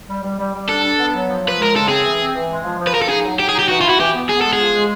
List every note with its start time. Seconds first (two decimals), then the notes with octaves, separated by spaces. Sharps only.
0.09 G3
0.23 G3
0.39 G3
0.53 G3
0.69 D4 A4
0.83 D4
0.99 B3
1.14 F#3
1.28 F3
1.44 F3 B4
1.59 G#3 A#4
1.74 C#3 A4
1.88 C4 G#4
2.04 E3
2.19 C4
2.35 E3
2.49 G#3
2.64 F3
2.79 F3
2.87 B4
2.94 F3 A#4
3.02 A4
3.09 D#4 G#4
3.24 F#3
3.39 F#3 G4
3.49 G#4
3.54 D#4
3.59 G4
3.69 E3 F#4
3.81 F4
3.84 E4 F#4
4.00 E3 G4
4.15 B3
4.29 B3 G#4
4.41 G#3 A4
4.53 G#4
4.60 F3
4.74 G#3